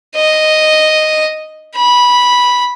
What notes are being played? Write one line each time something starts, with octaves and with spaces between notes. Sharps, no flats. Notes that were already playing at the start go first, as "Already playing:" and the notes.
D#5
B5